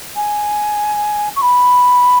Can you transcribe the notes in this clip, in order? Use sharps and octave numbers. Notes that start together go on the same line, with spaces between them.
G#5
C#6
B5